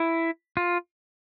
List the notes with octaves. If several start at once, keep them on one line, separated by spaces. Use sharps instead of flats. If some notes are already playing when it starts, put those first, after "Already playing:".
Already playing: E4
F4